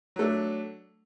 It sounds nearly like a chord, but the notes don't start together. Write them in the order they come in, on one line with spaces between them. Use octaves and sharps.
F#3 A3 D4